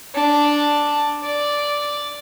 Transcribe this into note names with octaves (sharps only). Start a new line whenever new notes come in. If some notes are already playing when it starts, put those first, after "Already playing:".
D4
D5